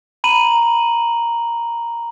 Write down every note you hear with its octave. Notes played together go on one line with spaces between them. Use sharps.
A#5 B5 D#7 F#7